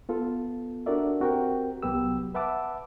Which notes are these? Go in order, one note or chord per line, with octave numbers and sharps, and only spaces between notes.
B3 F4 A4
D4 F#4 A4 A#4 D5 E5
C4 F#4 G4 A#4 G5
C2 F#3 B3 G4 E6
B4 E5 F#5 A5 D6 E6